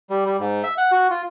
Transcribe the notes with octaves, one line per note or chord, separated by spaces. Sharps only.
G3
G3
G#2
E5
F#5
F#4
F4